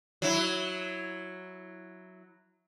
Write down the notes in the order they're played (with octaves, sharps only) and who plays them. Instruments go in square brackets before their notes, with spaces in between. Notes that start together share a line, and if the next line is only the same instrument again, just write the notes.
[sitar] F#3 E4